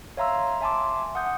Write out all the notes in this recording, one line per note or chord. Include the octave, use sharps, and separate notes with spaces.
C#5 E5 F5 A#5 C6 E6
E5 G#5 A5 C6 D6
F#5 D#6 G6